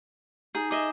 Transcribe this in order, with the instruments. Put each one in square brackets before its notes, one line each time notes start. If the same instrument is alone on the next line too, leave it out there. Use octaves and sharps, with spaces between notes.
[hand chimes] D#4 A#5 G6 [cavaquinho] G#4
[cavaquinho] G#4 D#5 E5 [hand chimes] D6